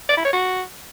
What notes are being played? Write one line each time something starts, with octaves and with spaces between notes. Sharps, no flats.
D5
E4
C#5
F#4